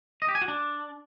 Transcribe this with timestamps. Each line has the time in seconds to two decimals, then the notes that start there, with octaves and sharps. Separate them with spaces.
0.22 D#5
0.28 G4
0.35 G#5
0.42 F#4
0.48 D4